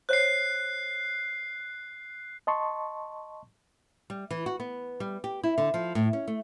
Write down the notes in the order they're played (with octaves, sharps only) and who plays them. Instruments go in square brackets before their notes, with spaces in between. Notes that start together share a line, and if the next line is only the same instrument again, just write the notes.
[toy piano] C5 C#5 F#5 [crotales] F#6 C7
[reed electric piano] D#5 A5 C6 C#6
[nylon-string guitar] G3
E3
F#4
B3
G3
G4
E4
D3
F3
A2
C#4
A3